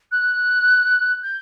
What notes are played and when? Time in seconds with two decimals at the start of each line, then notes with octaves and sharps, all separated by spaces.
0.12 F#6
1.23 G6